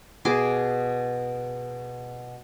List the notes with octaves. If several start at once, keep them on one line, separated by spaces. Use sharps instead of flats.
B2 G#4 C6 D6